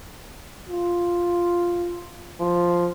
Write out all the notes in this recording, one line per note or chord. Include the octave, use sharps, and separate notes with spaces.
F4
F3